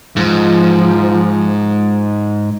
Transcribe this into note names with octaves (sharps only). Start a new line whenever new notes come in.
G#2 F3